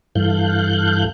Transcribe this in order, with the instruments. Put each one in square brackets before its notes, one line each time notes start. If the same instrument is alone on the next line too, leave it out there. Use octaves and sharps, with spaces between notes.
[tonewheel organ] G2 E3 A4 F5 F#6 G6